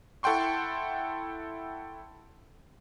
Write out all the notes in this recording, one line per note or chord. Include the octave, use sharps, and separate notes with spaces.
E4 A4 F#5 G5 C6 C#6